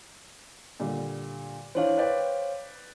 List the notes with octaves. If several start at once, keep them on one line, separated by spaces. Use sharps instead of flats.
A#2 D3 G3
E3 D4 C5 C#5 F5
B4 D5 G5